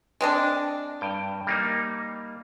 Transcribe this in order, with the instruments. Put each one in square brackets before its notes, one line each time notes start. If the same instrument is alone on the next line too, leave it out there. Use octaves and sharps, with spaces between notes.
[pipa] G#3 C4 D4
[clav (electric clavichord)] G2 G5
G3 A#3 D#4